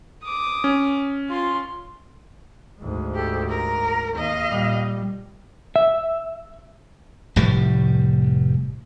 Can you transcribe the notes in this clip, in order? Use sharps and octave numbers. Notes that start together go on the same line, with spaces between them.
D6 D#6
C#4
F4 C6
D2 G#2
G4 A4
A#4 A#5
D#2 D#5 F5
A#2 G3
E5
F1 A2 G3